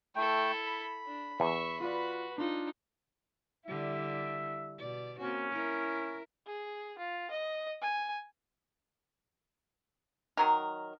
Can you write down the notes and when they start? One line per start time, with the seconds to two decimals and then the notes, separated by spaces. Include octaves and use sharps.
0.16 A3 E4 A4 G5
0.66 B5
1.07 D4
1.40 E2 E5 C#6
1.80 F4 F#4 B4 D5
2.38 D4 D#4 F4
3.66 D3 G3 E4 E5
4.80 B2 D5
5.19 A#3 C4 C#4 F#4
5.52 E4 A#4
6.46 G#4
6.98 F4
7.31 D#5
7.82 G#5
10.37 D#3 F#3 A#4